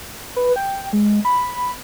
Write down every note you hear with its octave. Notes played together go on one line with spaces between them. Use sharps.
B4
G5
G#3
B5